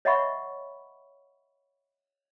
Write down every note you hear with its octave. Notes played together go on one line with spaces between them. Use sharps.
C#5 D#5 E5 F#5 B5 C#6